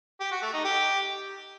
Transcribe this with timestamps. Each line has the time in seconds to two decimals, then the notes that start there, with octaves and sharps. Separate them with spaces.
0.20 G4
0.31 F#4
0.42 A3
0.53 D#4
0.64 G4